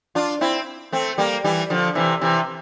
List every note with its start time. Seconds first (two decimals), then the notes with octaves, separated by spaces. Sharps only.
0.15 D4 F4
0.41 C4 E4
0.92 A3 C4
1.18 G3 A#3
1.44 E3 G3
1.70 D3 F3
1.95 C3 E3
2.21 C3 E3